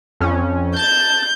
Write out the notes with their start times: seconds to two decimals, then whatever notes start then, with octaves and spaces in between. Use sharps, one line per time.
0.20 F2 C#4
0.76 A5 G6 A6